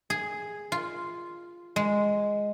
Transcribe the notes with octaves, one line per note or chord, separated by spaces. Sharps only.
G#4
F4
G#3